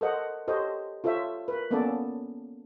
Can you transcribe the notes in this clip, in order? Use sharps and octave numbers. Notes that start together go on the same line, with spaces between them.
A4 A#4 C5 D#5 F#5
G4 A4 C5 C#5 D#5
F4 A4 C5 C#5 E5
A#4 B4
A#3 B3 C#4 A4 D5 A5